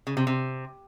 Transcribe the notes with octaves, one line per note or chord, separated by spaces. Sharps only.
C#3
C3
C3